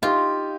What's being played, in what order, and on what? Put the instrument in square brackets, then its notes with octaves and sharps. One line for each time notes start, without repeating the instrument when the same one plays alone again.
[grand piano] D#4 G4 [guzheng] F4